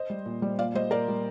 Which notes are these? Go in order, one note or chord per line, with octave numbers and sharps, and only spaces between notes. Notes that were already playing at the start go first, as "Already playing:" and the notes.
Already playing: C5 D#5
G3
A#2
G3
A#2 D5 F5
G3 C5 D#5
A#2 A#4 D5
G3